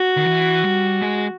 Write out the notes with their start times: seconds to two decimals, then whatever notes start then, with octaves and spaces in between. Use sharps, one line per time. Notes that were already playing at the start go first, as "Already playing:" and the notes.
Already playing: F#4
0.17 D#3
0.25 E3
0.64 G3
1.01 G#3